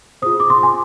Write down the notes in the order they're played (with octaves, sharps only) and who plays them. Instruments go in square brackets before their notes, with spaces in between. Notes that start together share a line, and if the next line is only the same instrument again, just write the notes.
[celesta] F4 G#4 C5 D#6
D6
C6
G#5